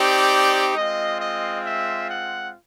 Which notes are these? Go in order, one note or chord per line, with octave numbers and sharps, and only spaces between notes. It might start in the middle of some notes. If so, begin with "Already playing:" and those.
Already playing: C4 D#4 G4 D5
G#3 C4 F4 D#5
D#5
E5
F#5